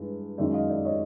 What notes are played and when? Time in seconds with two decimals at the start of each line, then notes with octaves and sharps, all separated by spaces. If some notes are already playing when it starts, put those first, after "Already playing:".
Already playing: G2 E3 G#3
0.38 F#2 D#3 G#3 D5 E5
0.53 D#5 F5
0.70 D5 E5
0.85 C#5 D#5